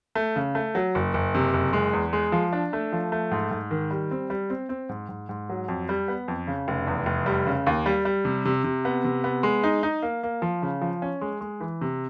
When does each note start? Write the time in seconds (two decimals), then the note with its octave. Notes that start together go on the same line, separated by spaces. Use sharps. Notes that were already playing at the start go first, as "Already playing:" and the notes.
0.15 A3
0.36 C#3
0.55 A3
0.75 F#3
0.95 F#1
1.14 F#1
1.35 C3
1.54 F#1
1.73 G#3
1.93 E2
2.13 G#3
2.32 F3
2.53 D4
2.73 A3
2.92 F3
3.12 A3
3.31 G#2
3.51 G#2
3.71 D#3
3.91 G3
4.11 C4
4.30 G3
4.50 C4
4.69 C4
4.89 G#2
5.09 G#2
5.29 G#2
5.49 F#3
5.68 F2
5.89 G3
6.08 B3
6.28 F2
6.47 C#3
6.68 F1
6.87 E2
7.06 F1
7.26 G3
7.47 C#3
7.67 D#2
7.86 G3
8.05 G3
8.25 C3
8.45 C3
8.64 C3
8.85 B3
9.04 C3
9.24 B3
9.43 G#3
9.63 D#4
9.83 D#4
10.02 A#3
10.23 A#3
10.42 F3
10.62 C#3
10.81 F3
11.02 C#4
11.21 G#3
11.41 G#3
11.60 E3
11.81 C3